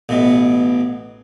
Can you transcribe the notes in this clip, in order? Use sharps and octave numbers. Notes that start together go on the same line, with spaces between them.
A1 B2